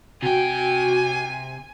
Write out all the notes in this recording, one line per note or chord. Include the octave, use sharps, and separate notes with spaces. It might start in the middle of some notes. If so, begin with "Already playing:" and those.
C3 F#4 G5 G#5